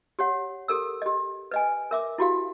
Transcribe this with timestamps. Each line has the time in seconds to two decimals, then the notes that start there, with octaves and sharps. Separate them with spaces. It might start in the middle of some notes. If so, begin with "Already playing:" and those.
0.19 G4 C#5 F#5
0.68 G4 A4 A#4 E6
1.02 G4 D#5
1.51 B4 D#5 G#5
1.91 A#4 E5 D6
2.18 E4 F#4 G4 F5